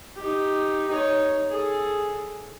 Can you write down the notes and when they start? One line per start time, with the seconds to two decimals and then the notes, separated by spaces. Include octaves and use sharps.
0.16 D#4 G4
0.87 D#4 C#5
1.50 G#4 A4